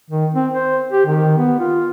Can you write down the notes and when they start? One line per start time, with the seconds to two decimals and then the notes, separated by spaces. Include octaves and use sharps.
0.10 D#3
0.34 C4
0.54 C5
0.92 G4
1.06 D#3
1.38 B3
1.60 F4